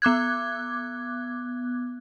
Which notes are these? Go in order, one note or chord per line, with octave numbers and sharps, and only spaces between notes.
B3 D6 F#6 G#6